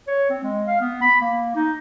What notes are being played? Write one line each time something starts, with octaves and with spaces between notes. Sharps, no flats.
C#5
C4
G#3
F5
B3
B5
A#3
D#4